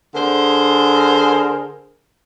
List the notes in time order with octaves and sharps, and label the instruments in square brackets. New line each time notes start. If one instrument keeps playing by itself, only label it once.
[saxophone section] D3 G#4 A#4 C5